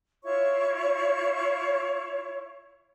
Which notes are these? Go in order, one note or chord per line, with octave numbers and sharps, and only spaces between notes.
E4 F4 C#5 C#6